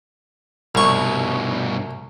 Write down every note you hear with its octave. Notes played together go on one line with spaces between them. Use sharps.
C2 G2 B2 C#6